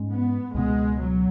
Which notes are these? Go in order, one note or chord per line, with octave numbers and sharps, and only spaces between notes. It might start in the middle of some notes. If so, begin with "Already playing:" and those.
Already playing: G#2 G#3 C#4
B3
C#2 B2 G#3 B3
F#3